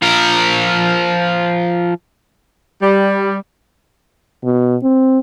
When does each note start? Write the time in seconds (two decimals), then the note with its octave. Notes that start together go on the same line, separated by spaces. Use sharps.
0.02 F3 A#4
2.82 G3
4.44 B2
4.83 C4